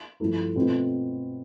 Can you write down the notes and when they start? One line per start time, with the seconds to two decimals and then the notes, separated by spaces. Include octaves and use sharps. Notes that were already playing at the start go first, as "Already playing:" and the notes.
0.20 G2 F3 A3 E4 A4
0.55 B2 A3 C4 F4 B4